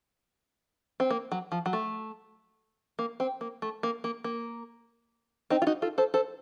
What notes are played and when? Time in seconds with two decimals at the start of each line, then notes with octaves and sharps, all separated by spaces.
1.00 C4
1.10 A#3
1.32 F#3
1.52 F3
1.66 F#3
1.73 A3
2.99 A#3
3.20 C4
3.41 A#3
3.62 A3
3.83 A#3
4.04 A#3
4.24 A#3
5.50 C4 D#4
5.62 F4
5.67 D#4 F#4
5.82 F4 A4
5.98 A4 C5
6.14 A4 C5